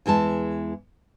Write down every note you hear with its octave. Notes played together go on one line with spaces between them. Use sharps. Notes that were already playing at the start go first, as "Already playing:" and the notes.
E2 E3 G#3 A5